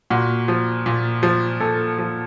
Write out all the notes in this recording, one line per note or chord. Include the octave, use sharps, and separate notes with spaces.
A#2 F#4
F3
A#2
F3
A#2 A4
F3